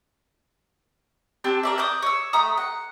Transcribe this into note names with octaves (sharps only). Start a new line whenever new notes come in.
C4 D4 G4 A5
A#4 D5 E5
D6 D#6 F#6 G6
C#5 E6
A3 E5 A#5 D#6
F#5